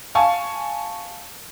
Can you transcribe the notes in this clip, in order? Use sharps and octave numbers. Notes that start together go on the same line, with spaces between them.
F5 G#5 A5 C#6